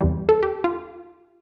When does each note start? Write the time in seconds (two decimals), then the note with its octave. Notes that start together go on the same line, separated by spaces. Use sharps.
0.01 E2 C3 E3 G3
0.29 A4
0.43 G4
0.64 F4